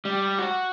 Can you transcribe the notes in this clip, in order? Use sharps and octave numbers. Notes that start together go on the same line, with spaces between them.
G3
F#4